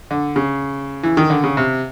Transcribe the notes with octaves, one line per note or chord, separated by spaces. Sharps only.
D3
C#3
E3
D#3
D3
C#3
C3